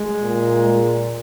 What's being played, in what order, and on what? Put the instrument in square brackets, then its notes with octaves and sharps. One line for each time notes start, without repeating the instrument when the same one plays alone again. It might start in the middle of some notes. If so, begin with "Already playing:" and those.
Already playing: [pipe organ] G#3
[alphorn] A#2